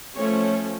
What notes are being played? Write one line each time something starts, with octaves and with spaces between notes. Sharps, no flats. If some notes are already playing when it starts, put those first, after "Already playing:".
F3 A3 C#4 C#5